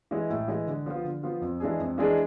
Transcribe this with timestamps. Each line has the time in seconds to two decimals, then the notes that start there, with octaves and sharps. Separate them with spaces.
0.11 E3 G#3
0.30 A2
0.48 E3 G#3
0.67 D3
0.86 F3 B3 F4
1.05 D3
1.23 F3 B3 F4
1.41 F2
1.60 E3 G#3 D4 G#4
1.80 F2
1.98 E3 G#3 D4 G#4